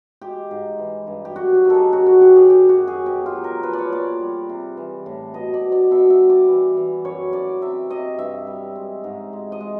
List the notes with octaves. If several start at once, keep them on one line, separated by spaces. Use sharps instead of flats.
G#3 G4
G#2
E3
G2
G4
F#2 F#4
G4
D#3
G#4 A4
F#2 F#4
F#4
F#2 G4
G#4
F#2 G4
F#4
F#2
G#4
B2 G4
F4
F#3
A#4
F3 B4
D5
C#5
A#2 D5
G3
C3
E3
A2
B2 D#5
D5
B2
D5
B2 E5
E5
G3
D5
E3
E3
F#2 C#5
F#2 D5
C3 E5
C3 D#5
G2 E5
G3
G#3
G#2
G#3
D#5
G#3